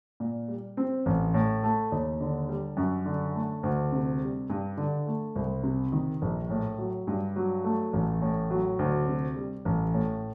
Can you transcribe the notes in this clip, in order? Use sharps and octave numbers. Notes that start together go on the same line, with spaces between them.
A#2
G3
C4
A1
A2
A3
D#2
D3
G3
F#2
D3
A3
D2
C3
G3
G2
D3
A3
C2
C3
D#3
A#1
A2
F#3
G2
F#3
A3
A1
A2
F#3
D2
C3
G3
A1
A2